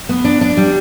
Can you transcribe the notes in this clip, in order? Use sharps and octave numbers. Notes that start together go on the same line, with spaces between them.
B3
D4
D4
G3